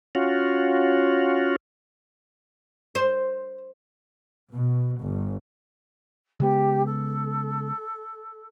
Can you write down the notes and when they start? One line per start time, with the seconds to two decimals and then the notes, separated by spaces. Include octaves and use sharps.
0.15 C#4 F4 F#4
2.95 C5
4.52 B2
5.00 G1
6.40 C#3 G#3 B3 G4
6.85 A4